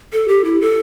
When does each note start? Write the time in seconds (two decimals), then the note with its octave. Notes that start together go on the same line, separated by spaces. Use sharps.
0.13 A4
0.28 G4
0.44 E4
0.61 A4